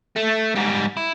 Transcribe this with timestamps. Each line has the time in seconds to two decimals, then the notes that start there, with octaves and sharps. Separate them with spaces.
0.16 A3
0.55 G#2 G3
0.97 E4